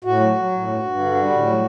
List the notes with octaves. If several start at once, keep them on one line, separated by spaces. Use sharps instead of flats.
A2 F#4
F#3
F#3
A2
G2
G2
D3
G3
A2
F#3